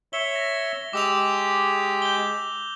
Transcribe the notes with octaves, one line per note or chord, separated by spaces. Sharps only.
C#5 E5 G7
A#6
G#3 G4 D6 E6 F7
G6 G7